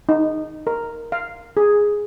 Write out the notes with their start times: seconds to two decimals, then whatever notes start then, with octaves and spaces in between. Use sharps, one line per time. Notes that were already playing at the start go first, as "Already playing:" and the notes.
0.09 D#4
0.67 A#4
1.12 F5
1.57 G#4